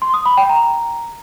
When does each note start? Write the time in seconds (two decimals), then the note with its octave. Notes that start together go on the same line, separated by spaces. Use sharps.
0.02 C6
0.14 D#6
0.26 B5
0.38 G5
0.49 A#5